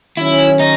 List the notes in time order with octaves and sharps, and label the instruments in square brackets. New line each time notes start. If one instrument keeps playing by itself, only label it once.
[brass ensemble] D#3 F#3 C#4 [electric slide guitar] E4
[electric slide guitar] D#4